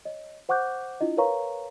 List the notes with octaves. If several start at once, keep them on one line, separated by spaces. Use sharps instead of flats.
C#5 D#5
C5 F#5 C#6 D6 F#6 G6
D4 E4 F4 D#5
A#4 B4 C#5 F5 A#5 C#6